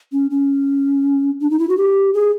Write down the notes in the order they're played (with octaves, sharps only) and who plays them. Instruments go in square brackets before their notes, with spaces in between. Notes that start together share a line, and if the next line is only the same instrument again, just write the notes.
[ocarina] C#4
C#4
D4
D#4
E4
F#4
G4
G#4